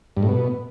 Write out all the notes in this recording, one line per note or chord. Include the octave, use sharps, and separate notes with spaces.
G2
A2
B2